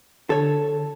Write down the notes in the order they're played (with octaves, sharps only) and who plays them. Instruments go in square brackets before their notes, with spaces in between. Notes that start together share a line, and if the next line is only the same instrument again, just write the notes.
[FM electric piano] D3 [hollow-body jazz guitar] A4 C#5